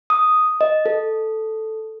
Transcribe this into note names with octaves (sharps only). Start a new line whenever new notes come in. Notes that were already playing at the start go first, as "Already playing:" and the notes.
D#6
D#5
A4